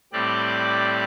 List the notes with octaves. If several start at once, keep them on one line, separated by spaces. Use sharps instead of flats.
A2 G3 C4 G4 D5 F#6